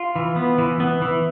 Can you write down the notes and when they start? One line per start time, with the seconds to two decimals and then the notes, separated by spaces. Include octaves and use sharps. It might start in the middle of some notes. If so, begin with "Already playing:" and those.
Already playing: F4
0.16 E3
0.36 B3
0.58 E3
0.80 B3
1.02 E3